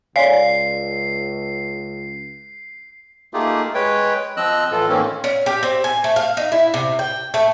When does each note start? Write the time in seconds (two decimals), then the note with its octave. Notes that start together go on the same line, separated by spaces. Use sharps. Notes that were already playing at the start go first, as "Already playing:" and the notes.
0.16 C#2 C#5 D5 F5 G#5 C6 C7
3.34 A3 A#3 D#4 F4 G4 G#4
3.75 G#3 B4 C#5 G5
4.37 F3 C4 D#5 E6 F#6
4.72 A2 E3 F4 A4
4.89 A2 D#3 E3 A#3 C4 C#4
5.24 C#4
5.46 G4
5.63 C4
5.84 G#5
6.04 A3
6.16 F5
6.37 D#4
6.52 E4
6.74 C3
6.99 G5
7.34 A3